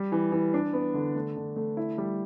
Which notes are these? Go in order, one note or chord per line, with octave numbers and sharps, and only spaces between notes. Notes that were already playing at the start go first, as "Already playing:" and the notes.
Already playing: G3
E3
E3
D4
B3
D3
A3
D3
A3
E4
G3